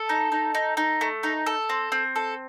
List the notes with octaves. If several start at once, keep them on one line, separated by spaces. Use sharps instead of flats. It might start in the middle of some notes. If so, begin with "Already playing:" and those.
Already playing: A4
D#4
D#4
D#4
D#4
A3
D#4
A4
C4
C4
A4